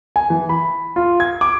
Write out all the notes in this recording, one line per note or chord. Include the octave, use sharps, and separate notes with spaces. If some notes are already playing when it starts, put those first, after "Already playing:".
G#5
E3
B5
F4
G#6
D6